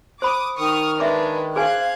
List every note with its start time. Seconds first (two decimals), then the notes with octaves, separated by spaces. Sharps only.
0.22 C5 B5 D6 D#6
0.58 D#3 C#6 D#6 F6
1.00 G#3 D4 B4 E5 D6
1.56 G#4 B4 C5 F5 G#5 F#6 G#6